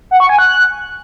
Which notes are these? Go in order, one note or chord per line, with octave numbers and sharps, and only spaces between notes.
F#5
C#6
G#5
F#6